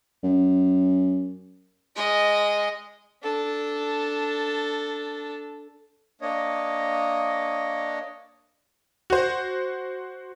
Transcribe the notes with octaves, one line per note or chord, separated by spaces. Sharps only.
F#2
G#3 D#5
D4 A4
A#3 D4 C#5 D#5
F#4 C5